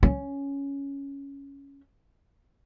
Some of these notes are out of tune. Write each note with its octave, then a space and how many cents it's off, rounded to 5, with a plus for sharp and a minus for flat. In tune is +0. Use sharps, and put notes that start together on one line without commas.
C#4 +5